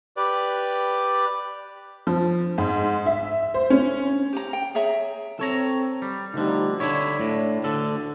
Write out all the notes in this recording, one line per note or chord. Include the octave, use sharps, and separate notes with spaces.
G4 B4 D5
F3
G#2
E5
C5
C#4
G4 A#5
G5
G#4 C#5 E5 A#5
C4 A4 C#5 A#5
G3
D2 D3 F3 G3 D#4
D3 D4 E4 C#5
A2
D2 D3 A4